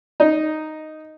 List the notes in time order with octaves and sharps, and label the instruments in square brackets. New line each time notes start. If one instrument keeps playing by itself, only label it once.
[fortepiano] D#4